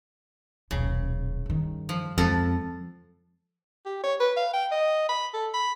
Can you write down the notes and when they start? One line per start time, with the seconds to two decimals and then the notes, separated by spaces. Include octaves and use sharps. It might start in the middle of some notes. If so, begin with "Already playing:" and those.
0.71 D#1 B1 C#3
1.46 G2 D#3
1.89 F3
2.18 F2 F3 G#3 C4 A4
3.86 G4
4.04 C#5
4.20 B4
4.37 F5
4.53 G5
4.72 D#5
5.09 B5
5.34 A4
5.54 B5